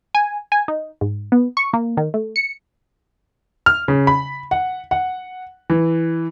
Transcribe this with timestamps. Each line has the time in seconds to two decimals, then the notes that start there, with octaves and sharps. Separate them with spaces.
0.15 G#5
0.52 G#5
0.68 D#4
1.01 G#2
1.32 B3
1.57 C#6
1.73 A#3
1.97 D#3
2.14 A3
2.36 C#7
3.66 F6
3.88 C#3
4.07 B5
4.51 F#5
4.91 F#5
5.70 E3